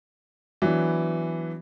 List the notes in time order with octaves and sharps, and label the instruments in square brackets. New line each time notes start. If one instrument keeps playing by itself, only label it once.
[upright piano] E3 F#3 B3 D4